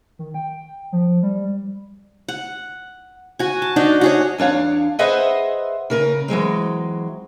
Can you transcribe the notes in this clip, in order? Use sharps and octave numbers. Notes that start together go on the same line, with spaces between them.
D#3
G5
F3
G3
F#5
F#4 G#5
A5
D4 D#4 F#4
F#4 G#4 C#5
E2 D4 C#5 F5
G#4 B4 C5 D#5 E5 F#5
C#3 A#4 B4
E3 F#3 G#3 C4